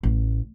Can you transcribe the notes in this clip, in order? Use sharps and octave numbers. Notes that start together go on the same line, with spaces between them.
A1